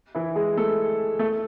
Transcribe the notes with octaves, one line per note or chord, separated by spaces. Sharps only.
E3 E4
G#3 G#4
A3 A4
A3 A4